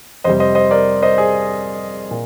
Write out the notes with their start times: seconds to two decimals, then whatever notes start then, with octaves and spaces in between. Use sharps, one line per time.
0.24 F2 C3 G3 C5 D#5
0.40 C5 D#5
0.55 C5 D#5
0.71 A#4 D5
1.03 C5 D#5
1.18 G#4 C5
2.11 A#2